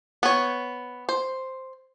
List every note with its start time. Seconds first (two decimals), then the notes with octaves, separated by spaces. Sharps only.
0.23 B3 C#5
1.09 C5